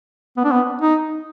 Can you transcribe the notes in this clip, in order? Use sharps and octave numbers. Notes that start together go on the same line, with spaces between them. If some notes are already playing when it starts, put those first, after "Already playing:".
B3
D4
B3
D#4